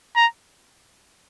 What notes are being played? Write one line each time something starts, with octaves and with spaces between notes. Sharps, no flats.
A#5